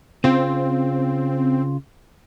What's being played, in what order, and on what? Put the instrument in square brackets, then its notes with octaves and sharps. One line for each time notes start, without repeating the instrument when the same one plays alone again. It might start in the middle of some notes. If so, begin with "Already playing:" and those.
[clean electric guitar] C#3 F4 [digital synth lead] C4